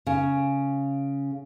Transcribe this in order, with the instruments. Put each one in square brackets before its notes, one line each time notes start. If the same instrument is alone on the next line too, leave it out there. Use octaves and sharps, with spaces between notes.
[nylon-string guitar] C#3